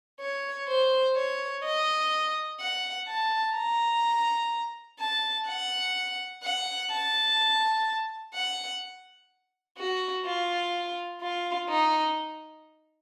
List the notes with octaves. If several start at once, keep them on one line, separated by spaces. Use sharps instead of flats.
C#5
C5
C#5
D#5
F#5
A5
A#5
A5
F#5
F#5
A5
F#5
F#4
F4
F4
D#4